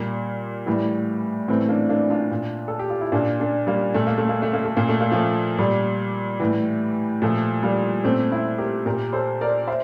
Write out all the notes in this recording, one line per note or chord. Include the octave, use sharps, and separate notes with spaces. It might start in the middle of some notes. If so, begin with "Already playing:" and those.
Already playing: A#2 G3 A#3
A2 E3 G3
A2 E3 A3 C4
A#3 D4
A#3 D4
D4 F4
A#2
A4
G4
F4
E4
A#2 A#3 D4
A#3 D4
G3 A#3
A#2 A3
A#3
A3
A#3
A3
A#3
A3
A#2 A#3
A3
A#3
F3 A3
A#2 G3
A2 E3
A#2 F3 A3
G3 A#3
A#2 A3 C4
C4 E4
G4 A#4
A#2 G4 A#4
A4 C5
A#4 D5
C5 E5